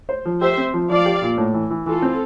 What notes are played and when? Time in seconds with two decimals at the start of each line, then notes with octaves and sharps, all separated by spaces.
0.09 C5
0.25 F3
0.41 G4 C5 E5
0.57 C4
0.74 F3
0.90 F3 D5 F5
1.06 G4
1.22 A#2
1.38 A2
1.54 E3
1.70 E3
1.86 E3 F4 A4
2.02 C4